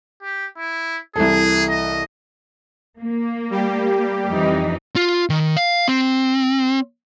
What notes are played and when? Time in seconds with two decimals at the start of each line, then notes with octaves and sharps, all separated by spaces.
0.22 G4
0.58 E4
1.16 C2 E3 G#4 A4
1.70 D#5
3.01 A#3
3.50 G3 G4
4.30 F2 E3 D#4
4.96 F4
5.30 D#3
5.57 F5
5.88 C4